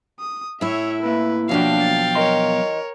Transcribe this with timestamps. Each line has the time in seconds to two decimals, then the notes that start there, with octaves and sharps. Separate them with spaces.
0.20 D#6
0.61 A2 E4 C#5 E5
1.03 C3 A#3 B4 E5
1.49 B2 F3 F#3 D4 F#4 F5 G5
1.82 A6
2.15 E3 A#4 C#5 D#5 C6